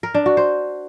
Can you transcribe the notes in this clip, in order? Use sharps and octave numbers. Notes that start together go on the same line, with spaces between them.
A#4
D4
F#4
C5